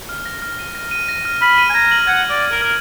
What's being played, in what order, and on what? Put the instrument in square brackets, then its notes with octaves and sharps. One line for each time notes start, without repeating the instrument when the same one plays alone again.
[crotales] F6
A#6
F6
D#7
A#6
D#7
A#6
F6
[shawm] B5 [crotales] F6
[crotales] D#7
[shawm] G#5
[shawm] A#5 [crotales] G#6
[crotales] F#7
[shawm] F#5 [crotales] G#6
[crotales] D#7
[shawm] D5
[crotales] D#7
[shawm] A#4
[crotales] F#7
[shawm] A#4